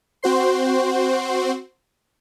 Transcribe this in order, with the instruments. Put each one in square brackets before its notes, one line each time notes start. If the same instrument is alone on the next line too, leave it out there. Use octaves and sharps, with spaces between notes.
[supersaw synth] C4 F#4 C5 C6